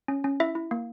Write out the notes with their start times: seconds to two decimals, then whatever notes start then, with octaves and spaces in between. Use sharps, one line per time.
0.08 C#4
0.24 C#4
0.40 E4 E5
0.55 E4
0.71 A#3